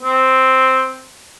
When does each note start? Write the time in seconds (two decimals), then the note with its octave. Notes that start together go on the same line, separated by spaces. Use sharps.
0.02 C4